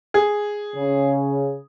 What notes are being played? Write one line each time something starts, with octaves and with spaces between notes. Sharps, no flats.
G#4
C#3